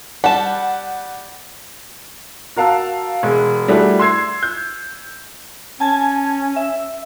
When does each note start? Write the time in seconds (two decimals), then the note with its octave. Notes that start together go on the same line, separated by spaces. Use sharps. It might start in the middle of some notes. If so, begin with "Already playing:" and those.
0.24 G3 F#5 A5
2.56 F#4 A#4 F5 A5 E6
3.23 E1 G#3
3.68 G3 A3 D4 E4 F#4 G#4
3.99 C6 E6 G#6 C7
4.43 G6
5.80 C#4 G#5 A5 G#6
6.56 E5